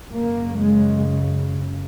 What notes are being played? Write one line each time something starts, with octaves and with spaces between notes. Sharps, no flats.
F#2 C#3 A#3
G#3